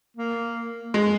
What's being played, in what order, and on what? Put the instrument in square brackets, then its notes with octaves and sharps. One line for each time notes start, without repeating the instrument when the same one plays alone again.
[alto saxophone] A#3
[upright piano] G#3